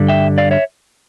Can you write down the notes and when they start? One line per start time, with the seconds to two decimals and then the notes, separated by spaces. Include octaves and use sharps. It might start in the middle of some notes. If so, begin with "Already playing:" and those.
Already playing: G2 D3 G3 D4
0.08 E5 G5
0.38 D5 F5
0.51 C#5 E5